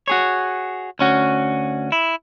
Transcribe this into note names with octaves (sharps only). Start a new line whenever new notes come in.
F#4 G#4 C#5
D2 C#4 F#4
E4